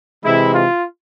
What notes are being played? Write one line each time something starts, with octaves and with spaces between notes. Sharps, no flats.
C3 E3 G#3 E4
F4